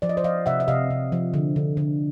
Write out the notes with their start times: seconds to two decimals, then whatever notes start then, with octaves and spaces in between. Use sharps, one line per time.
0.02 F3 D5
0.09 D#5
0.17 C5 D5
0.24 F3 D#5 F5
0.46 C3 E5 F#5
0.60 E5
0.68 C3 D#5 F5
0.90 C3
1.12 F3
1.34 D3
1.56 D3
1.77 D3